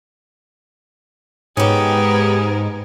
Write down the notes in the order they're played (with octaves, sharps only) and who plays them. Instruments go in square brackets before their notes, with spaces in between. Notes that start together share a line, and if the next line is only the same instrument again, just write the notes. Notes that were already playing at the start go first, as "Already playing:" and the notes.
[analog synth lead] G#2 [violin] B3 A#4 [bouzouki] C#4 G4 [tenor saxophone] G#4